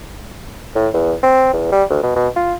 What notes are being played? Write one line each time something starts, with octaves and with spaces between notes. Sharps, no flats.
A2
E2
C4
E2
G3
D2
B2
B2
F4